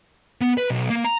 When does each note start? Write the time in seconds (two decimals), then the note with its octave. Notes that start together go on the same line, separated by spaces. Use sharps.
0.41 B3
0.57 B4
0.70 B1
0.90 A#3
1.04 A#5